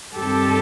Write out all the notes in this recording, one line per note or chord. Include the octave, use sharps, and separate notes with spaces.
G2 D#3 G3 C4 G4 A4